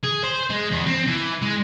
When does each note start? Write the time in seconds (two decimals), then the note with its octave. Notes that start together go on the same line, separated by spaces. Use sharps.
0.03 G#4
0.24 C5
0.50 G#3
0.71 E2
0.86 C4
1.07 E3
1.42 G#3